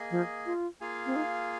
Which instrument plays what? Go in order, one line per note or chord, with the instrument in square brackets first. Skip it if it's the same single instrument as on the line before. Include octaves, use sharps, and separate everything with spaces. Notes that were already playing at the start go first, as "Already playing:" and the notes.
Already playing: [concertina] A#3 G#4 D#5 G#5
[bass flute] F3
F4
[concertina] A#3 F4 G#4 F5 G#5
[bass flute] C4
D#4